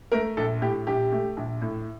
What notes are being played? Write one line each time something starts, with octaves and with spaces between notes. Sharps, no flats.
A3 A#4
A#1 A4
A2 G4
A#1 G4
A3
A#1
A2